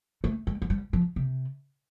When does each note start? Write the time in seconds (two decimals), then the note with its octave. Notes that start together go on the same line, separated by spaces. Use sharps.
0.24 A3
0.47 G#3
0.62 F#3
0.70 G3
0.93 F3
1.16 C3